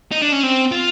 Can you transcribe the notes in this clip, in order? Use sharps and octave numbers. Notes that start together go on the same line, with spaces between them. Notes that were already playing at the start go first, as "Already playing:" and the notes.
D#4
D4
C#4
C4
F4